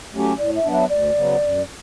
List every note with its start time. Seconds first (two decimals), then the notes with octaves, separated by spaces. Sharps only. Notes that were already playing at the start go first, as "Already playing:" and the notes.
0.12 F#3 A3 C#4 G4
0.38 A2 D5
0.56 E5
0.64 F#3 B3 D4
0.73 E5
0.90 D2 D5
1.15 C#3 F#3 B3
1.42 F#2